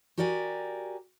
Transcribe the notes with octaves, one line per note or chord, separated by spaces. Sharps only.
F#4 G4 A#4 D5 E5 G#5